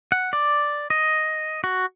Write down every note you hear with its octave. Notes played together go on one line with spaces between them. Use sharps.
F#5
D5
D#5
F#4